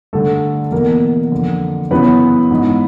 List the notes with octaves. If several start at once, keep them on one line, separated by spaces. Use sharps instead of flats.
G2 D3 A3 A4
E2 B2 A#3 A#4
F2 D3
F#2 C#3 E3 B3 B4
G#2 E3